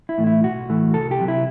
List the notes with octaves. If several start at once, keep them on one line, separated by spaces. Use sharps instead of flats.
E4
A2 E3 A3
E4
B1 F#4
A2 E3 A3
C2 A4
G4
C3 F#3
E4